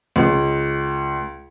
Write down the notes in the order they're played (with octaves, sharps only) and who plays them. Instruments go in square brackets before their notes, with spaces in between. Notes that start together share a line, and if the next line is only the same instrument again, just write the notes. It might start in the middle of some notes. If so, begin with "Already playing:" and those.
[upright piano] C#2